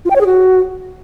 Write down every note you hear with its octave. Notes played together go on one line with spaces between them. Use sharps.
F4
G5
C#5
G#4
F#4